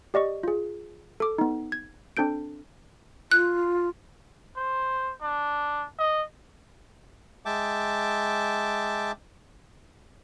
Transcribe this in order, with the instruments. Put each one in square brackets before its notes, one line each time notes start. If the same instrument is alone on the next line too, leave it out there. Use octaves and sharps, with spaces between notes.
[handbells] G4 D5 D#5 C#6
F4 G#4
A4 D6
B3 D#4
G#6
C4 D4 A4 G6 D7
[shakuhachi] F4 [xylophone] F#6
[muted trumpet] C5
D4
D#5
[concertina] G#3 E5 G5 A5 D6